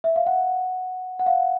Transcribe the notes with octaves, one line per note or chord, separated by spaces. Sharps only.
E5
F5
F#5
F#5
F5